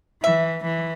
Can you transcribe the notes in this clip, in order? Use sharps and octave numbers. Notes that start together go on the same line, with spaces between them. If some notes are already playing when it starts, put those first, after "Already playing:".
E3 E5
E3